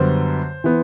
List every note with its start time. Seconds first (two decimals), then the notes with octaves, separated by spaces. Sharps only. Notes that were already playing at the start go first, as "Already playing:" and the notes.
Already playing: F#2 D3 G3 B3 C5
0.64 E3 B3